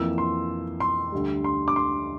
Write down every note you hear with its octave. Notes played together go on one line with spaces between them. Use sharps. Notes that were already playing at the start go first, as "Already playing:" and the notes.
Already playing: F2 E3 A#3 E4 E6
C6
C6
D2 D3 G3
C6
D6
C6